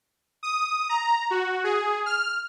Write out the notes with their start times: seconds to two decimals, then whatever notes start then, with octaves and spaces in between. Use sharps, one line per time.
0.43 D#6
0.89 A#5
1.31 F#4
1.64 G#4
2.06 F6